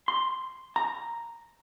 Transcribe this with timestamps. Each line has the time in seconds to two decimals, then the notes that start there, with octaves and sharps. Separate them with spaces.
0.08 C6
0.76 A#5